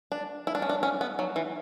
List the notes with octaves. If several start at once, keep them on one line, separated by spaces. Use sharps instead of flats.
D4
E4
D4
C#4
D4
C#4
B3
F#3
E3